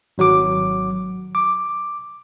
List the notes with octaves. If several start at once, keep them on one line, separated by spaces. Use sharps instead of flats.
G#1 F#3 F#4 D6
D6